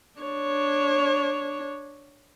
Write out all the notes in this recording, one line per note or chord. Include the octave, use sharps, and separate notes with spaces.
D4 C#5